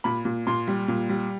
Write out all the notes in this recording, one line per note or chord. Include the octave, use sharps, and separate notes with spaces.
A#2 B5
A#2
A#2 C6
G3
A#2
G3